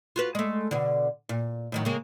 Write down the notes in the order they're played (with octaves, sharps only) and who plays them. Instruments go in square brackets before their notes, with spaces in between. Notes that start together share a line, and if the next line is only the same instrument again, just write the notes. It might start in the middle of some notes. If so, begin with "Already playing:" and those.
[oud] F4 F#4 B4
G#3 A3
B2 D3
A#2
A2 D#3 F#3
C#3 G#3 A#3